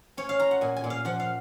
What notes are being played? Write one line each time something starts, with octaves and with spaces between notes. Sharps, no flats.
C#4 C#5
F5
F4 A#5
F#5
A#2 G#5
G#5
A#2
F5
F3 F#5
F5